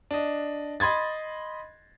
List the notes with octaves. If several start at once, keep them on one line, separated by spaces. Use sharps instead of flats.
D4 D#5
D#5 B5 C6 G#6 A6